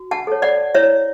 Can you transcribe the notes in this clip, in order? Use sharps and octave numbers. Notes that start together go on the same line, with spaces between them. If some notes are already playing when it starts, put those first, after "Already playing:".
Already playing: F#4
F#5 A5
A4 C#5
D5 F#5
E4 C#5 E5